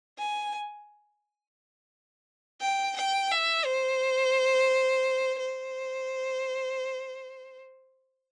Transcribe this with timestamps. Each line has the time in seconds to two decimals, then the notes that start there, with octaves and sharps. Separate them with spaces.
0.19 G#5
2.61 G5
2.97 G5
3.31 E5
3.65 C5
5.40 C5